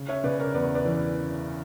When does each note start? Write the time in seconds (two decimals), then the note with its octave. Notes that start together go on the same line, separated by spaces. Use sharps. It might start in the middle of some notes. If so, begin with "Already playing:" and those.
Already playing: C#3
0.08 C#5 E5
0.24 C#3 B4 D5
0.39 A#4 C#5
0.54 E2 B4 D5
0.75 B4 D5
0.85 E3